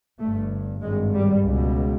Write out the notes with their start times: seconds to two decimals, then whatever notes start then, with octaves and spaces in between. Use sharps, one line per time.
0.19 G1 G2 A3
0.82 G#1 G2 G#3
1.14 G3
1.45 C#2 B2